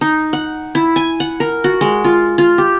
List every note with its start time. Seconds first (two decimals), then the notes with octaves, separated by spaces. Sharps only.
0.01 D#4
0.33 F#5
0.75 E4
0.96 G#5
1.20 F#5
1.40 A#4
1.64 F#4
1.81 G#3
2.04 F4
2.38 F4
2.58 G4